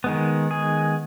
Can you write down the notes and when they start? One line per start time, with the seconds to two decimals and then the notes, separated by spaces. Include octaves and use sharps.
0.04 D#3 G#3 B3
0.51 G#4